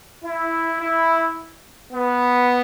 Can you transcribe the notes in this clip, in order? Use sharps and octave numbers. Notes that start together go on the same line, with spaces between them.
E4
E4
B3